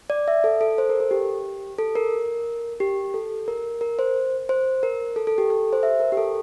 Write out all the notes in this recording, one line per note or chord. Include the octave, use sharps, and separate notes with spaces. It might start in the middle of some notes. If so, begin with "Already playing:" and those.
D5
E5
A4
A4
C5
A#4
A4
G4
A4
A#4
G4
A4
A#4
A#4
C5
C5
A#4
A4
A4
G4
A4
C5
E5
A#4
G4
A4